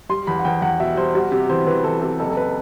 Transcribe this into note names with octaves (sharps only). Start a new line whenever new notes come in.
G3 C6
E2 B5
F#5
E2 G5
E2 F#5
B2 E5
G3 C5
G3 F#4
C3 G4
E3 C5
E3 B4
E3 A4
C3 A4
F#1 A4
A4
B4